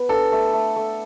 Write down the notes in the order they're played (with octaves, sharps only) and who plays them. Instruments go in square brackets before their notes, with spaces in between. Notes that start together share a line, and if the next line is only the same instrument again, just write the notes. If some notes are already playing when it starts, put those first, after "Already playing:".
Already playing: [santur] B3 B4
[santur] D4 [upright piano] A4
[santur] A3
A3
A3